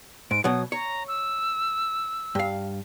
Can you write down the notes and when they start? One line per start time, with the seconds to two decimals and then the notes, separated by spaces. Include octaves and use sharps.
0.31 G#2 D7
0.44 B2 F#3 D#6
0.72 C#5 A#5
1.08 E6
2.35 G2 F5